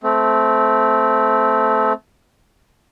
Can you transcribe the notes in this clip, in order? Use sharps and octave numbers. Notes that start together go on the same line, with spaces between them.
A3 C4